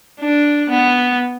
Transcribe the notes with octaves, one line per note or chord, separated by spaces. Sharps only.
D4
B3